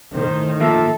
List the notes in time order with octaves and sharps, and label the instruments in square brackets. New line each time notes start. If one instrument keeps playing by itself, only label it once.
[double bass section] A2 D#3 [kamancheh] C5
[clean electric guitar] F3 A#3 [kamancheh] A4 [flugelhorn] E5